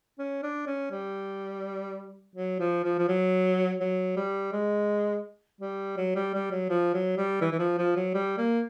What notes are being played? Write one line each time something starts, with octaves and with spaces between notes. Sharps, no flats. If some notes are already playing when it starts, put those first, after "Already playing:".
C#4
D4
C#4
G3
F#3
F3
F3
F3
F#3
F#3
G3
G#3
G3
F#3
G3
G3
F#3
F3
F#3
G3
E3
E3
F3
F3
F#3
G3
A#3